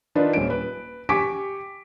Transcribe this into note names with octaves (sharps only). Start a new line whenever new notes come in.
D#3 D4 D#4 F4 B4
D#1 C#4 D7
B4
G4 G#5 C#6 D6 B6 D7